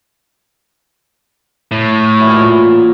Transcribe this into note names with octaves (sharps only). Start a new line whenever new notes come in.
A2
A#2 E3 F#3